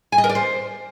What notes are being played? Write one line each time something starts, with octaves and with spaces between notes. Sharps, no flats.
G#5
D#5
A#4
D5
C5